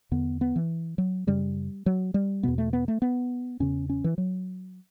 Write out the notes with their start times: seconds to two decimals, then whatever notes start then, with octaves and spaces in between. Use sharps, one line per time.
0.11 E2 D3 B3
0.41 B3
0.56 E3
0.98 F#3
1.27 F#2 C#3 G3
1.86 F#3
2.14 G3
2.43 E2 B2 B3
2.58 A3
2.73 B3
2.88 A3
3.02 B3
3.60 E2 C#3 C#4
3.90 C#4
4.04 E3
4.18 F#3